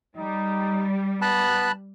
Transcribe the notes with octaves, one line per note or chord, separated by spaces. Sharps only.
G3 D#4
B3 A5 B5 F#6